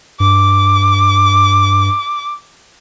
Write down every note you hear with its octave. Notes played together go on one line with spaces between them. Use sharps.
G2 D6